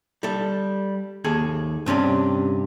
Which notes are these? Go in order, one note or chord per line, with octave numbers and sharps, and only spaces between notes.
G3 A4
D#2 G#4 A4
G2 C3 C#4 D4